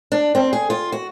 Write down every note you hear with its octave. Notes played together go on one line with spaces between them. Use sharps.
D4
C4
G#4
F4
F#4